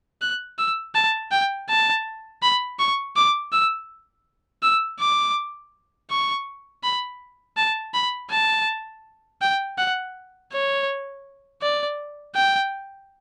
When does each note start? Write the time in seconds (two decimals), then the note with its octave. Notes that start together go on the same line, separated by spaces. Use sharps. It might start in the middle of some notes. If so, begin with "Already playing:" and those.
0.21 F#6
0.58 E6
0.95 A5
1.32 G5
1.69 A5
2.42 B5
2.79 C#6
3.16 D6
3.52 E6
4.63 E6
4.99 D6
6.11 C#6
6.84 B5
7.57 A5
7.94 B5
8.31 A5
9.42 G5
9.78 F#5
10.52 C#5
11.62 D5
12.35 G5